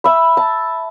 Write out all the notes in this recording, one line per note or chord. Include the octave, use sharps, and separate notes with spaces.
E5 B5
A5